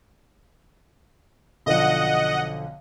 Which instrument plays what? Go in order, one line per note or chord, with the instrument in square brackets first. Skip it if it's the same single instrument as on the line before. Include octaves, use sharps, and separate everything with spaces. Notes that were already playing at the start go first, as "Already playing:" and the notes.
[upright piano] B1 D3 F3 [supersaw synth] D#5 F#5